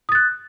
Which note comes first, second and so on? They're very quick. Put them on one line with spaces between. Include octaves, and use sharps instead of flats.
D#6 A6 F#6